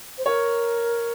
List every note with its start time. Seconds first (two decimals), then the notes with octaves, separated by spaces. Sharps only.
0.18 C5
0.26 A#4 C#5